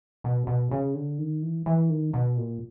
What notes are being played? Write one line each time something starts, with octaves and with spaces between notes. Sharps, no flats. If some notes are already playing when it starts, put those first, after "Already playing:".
B2
B2
C#3
D3
D#3
E3
E3
D#3
B2
A#2